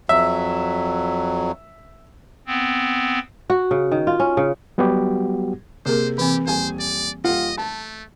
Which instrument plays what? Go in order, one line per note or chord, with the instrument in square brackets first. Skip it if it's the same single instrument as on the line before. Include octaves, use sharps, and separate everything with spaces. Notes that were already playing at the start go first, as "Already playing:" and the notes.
[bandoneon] F2 F#3 [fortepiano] E5
[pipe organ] B3 C4
[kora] F#4
C#3
D#3
F4
C#4
C#3
[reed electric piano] F#3 G3 B3 F#4 G4
[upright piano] C3 [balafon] A#3 G#4 A#4 [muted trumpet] C5
[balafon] E3 C4 [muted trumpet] G4
[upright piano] D#1 G#5 [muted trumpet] C5
[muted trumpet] D5
[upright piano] D#1 F4 F#5 [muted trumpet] D#5
[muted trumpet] A3 [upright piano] A5